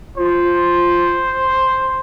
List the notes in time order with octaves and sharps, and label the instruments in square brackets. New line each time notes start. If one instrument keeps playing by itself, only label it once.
[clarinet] F4 [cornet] C5